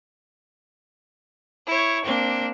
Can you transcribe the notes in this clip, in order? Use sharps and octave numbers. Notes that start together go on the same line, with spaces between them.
E4 C#5
A#3 C4 D4